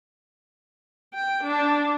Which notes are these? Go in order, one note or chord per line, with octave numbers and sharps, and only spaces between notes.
G5
D4